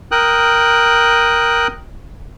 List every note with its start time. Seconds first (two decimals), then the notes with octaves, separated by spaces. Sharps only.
0.11 A#4 G5 D#6 F#6